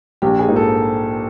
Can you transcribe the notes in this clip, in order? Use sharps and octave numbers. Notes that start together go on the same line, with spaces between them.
A#1 G4
G#4
G#2 F3 A#3 D#4
A4